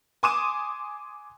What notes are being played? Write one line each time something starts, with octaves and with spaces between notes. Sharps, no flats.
G#5 C6 D6 D#6 D#7 E7